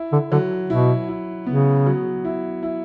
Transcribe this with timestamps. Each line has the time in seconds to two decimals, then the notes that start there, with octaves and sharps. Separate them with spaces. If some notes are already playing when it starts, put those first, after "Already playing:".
Already playing: E4
0.12 D3
0.32 D3 F#3
0.70 B2 E4
1.08 E4
1.46 C#3 B3
1.86 F#3
2.25 E4
2.63 E4